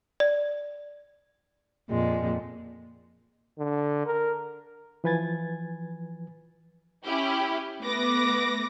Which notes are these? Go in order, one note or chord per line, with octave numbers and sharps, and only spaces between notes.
D5
F2 A#2 G#3
D3
A#4
E3 F3 B4 G#5 G#6 A6
C#4 E4 G4
A3 B3 B4 D6 A#6